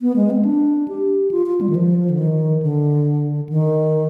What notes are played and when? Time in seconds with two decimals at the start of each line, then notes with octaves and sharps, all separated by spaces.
0.01 B3
0.16 G#3
0.30 C4
0.45 D4
0.88 G4
1.31 F4
1.46 F4
1.61 G3
1.70 D#3
1.75 F3
2.10 D3
2.19 D#3
2.62 D3
3.49 D#3